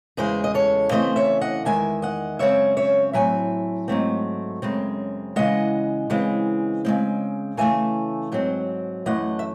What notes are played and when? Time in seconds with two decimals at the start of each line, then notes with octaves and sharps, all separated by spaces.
0.17 E2 C#3 G#3 G#4 C5
0.44 D#5
0.54 A4 C#5
0.91 C#3 E3 A3 C4 C5 D#5
1.16 C#5 E5
1.41 D#5 F#5
1.65 E2 D#3 G#3 E5 G#5
2.02 D#5 F#5
2.39 F#2 C#3 G#3 C4 C#5 E5
2.77 C#5 E5
3.13 A2 F#3 C4 E5 G#5
3.88 G#2 F#3 A3 C4
4.62 F#2 C#3 G#3 C4
5.36 C#3 E3 G#3 D#5 F#5
6.10 C#3 E3 G#3 C4
6.85 C#3 G#3 C4
7.57 C#3 E3 A3 E5 G#5
8.32 G#2 F#3 C4
9.06 F#2 E3 A3 D#5 F#5
9.39 E5